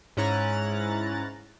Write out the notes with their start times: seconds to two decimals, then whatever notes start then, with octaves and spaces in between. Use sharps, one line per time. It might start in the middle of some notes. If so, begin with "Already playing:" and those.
0.17 G#2 C#4 E4 A#5 F#6 A6